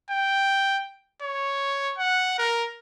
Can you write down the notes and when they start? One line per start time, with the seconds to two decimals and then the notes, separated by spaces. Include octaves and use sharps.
0.11 G5
1.22 C#5
1.98 F#5
2.39 A#4